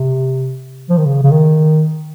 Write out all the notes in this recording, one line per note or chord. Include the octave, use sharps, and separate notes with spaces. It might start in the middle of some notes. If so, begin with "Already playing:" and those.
Already playing: C3
F3
D#3
C#3
C#3
D#3